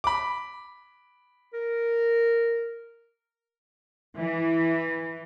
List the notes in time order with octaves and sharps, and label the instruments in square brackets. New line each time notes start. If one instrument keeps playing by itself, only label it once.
[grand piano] B5 D6
[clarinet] A#4
[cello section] E3